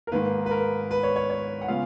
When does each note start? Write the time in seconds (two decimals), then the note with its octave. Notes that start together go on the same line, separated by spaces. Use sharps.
0.07 A#4
0.12 G#2 D#3 A#3 B4
0.46 B4
0.51 A#4
0.91 B4
1.03 C#5
1.16 C#5
1.30 C#5
1.61 F#5
1.68 C#3 G#3 B3 F4 F5